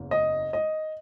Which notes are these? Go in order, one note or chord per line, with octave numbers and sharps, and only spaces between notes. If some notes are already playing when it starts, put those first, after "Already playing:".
Already playing: F#1 E2
D#5
D#5